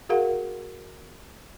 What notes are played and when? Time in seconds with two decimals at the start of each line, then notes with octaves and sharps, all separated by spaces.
0.09 F#4 G#4 A#4 F5 F#5